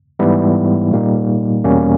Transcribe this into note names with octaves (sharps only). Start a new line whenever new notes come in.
G#2 E3 G3 B3 E4
A#2 G3 A#3 D#4
E2 B2 G3 A#3 C#4